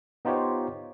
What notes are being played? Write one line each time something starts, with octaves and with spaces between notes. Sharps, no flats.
B3 D#4 F4 G4 C5 C#5